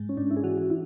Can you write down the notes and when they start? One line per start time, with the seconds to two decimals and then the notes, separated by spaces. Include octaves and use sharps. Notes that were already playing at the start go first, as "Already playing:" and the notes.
Already playing: G#2 G#3
0.09 C#4
0.17 G#2 D4
0.31 E4
0.37 G#4
0.44 E3 F#4
0.58 F#4
0.70 E4